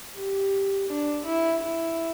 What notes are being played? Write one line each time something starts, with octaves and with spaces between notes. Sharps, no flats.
G4
D4
E4
E4